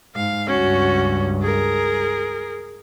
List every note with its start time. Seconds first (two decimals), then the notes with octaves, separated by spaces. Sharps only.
0.16 G#2 F5
0.48 C#2 G2 C#4 F#4
1.42 G#4 A#4